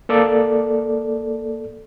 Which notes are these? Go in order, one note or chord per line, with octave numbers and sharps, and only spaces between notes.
A#3 A4 D5